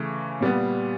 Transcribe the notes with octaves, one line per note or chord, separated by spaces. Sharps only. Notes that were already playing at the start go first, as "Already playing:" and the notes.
Already playing: C#3 E3 A3
A#2 G3 B3